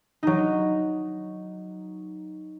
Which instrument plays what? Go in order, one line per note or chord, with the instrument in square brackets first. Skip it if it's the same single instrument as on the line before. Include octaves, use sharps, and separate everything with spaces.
[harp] F#3 D#4